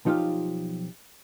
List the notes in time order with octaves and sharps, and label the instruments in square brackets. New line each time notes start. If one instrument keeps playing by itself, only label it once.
[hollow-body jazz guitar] B1 F3 D#4 F4 G4 F5